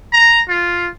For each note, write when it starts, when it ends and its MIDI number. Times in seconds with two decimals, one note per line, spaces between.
0.13 0.40 82
0.49 0.88 65